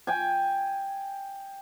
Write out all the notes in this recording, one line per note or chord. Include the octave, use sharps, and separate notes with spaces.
G5 G#5